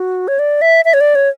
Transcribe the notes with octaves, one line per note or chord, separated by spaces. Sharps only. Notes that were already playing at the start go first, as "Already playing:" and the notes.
Already playing: F#4
C#5
D5
E5
E5
C#5
D5
C#5